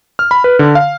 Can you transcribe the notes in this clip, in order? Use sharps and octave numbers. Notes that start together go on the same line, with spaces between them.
F6
B5
B4
D3
F5